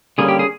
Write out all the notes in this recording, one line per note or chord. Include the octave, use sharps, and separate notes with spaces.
D3 G3 A#3 C#4 G#4
G4
G#4